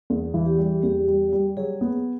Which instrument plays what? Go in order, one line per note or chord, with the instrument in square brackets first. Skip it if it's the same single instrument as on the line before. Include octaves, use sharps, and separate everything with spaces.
[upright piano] E2
E3
[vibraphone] G4
[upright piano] G3
[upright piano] E2 [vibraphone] G4
[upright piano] G3
G3
[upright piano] F#3 [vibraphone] G#4
[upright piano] B3